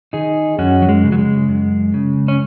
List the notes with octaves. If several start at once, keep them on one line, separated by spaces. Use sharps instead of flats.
D#3 D#4 G#4
F#2 C#4 F#4
F#3
G#3
C#3
F#3
G#3
F#2
C#3
C#4